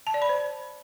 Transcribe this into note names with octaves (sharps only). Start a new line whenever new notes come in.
A5
D5
B5
C5